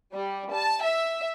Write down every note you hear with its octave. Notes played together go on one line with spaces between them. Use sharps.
G3
A5
E5